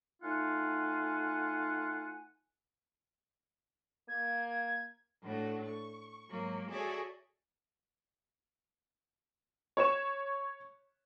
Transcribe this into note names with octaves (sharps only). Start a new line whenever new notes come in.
A3 D#4 F4 F#5 G#5
A#3 G#6
A2 A3 D4 F#4
C#6
G#2 F#3 A#3
F#4 G#4 A4 C#5 D5 E5
C#5 C#6 E7